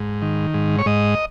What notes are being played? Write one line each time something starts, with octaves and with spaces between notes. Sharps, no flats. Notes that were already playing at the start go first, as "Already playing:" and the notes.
Already playing: G#2
D#3
G#2
C#5
G#2 D#5